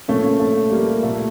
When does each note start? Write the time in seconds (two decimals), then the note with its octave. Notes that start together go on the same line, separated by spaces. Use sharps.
0.08 A#2 A3 C#4
0.40 A3
0.71 G3 A#3
1.03 A#2 A3